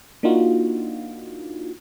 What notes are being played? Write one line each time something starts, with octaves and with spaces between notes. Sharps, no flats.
A#3 D4 D#4 F4 F#4